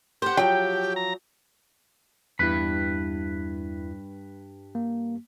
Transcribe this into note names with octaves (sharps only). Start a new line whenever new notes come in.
G4 C5 F#5
F3 F#3 G5
A#5
E2 G2 E4 B4 B5
A#3